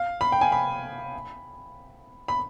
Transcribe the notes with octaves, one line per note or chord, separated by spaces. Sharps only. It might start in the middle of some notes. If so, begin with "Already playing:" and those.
Already playing: F5
B5
G5
G#5
B5
B5